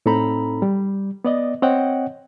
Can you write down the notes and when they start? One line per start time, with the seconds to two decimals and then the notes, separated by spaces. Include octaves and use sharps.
0.06 A2 C4 D#4 A4 A#5 B5
0.62 G3
1.25 B3 D5 D#5
1.62 C4 C#5 D#5 F#5 G5